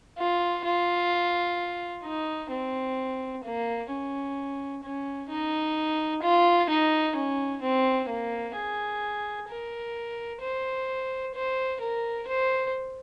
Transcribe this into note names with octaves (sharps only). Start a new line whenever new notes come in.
F4
F4
D#4
C4
A#3
C#4
C#4
D#4
F4
D#4
C#4
C4
A#3
G#4
A#4
C5
C5
A#4
C5